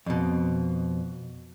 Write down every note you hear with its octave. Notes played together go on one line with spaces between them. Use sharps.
F2 B2